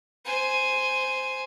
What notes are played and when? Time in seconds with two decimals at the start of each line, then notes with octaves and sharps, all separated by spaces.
0.25 C5 G#5